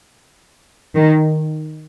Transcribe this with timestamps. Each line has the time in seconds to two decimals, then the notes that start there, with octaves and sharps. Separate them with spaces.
0.95 D#3